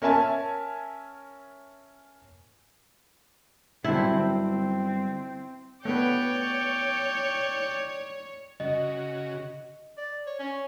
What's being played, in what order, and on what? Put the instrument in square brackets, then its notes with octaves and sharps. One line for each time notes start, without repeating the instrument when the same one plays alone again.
[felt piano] C#4 A#4 E5 G#5 A5
[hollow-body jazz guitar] G2 D3 F#3 [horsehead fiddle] C4 [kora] E4
[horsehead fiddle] C4
[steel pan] A3 B3 B4 [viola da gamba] C#5 [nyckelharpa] D5 G5
[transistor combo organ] C#3 F#4 [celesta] D#5
[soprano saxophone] D5
C#5
C#4